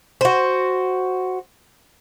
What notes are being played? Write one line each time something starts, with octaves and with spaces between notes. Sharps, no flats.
F#4 C5